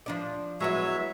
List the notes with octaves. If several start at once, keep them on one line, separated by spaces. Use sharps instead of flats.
F3 D4 D5
F#3 G#3 B3 E4 C#5 E5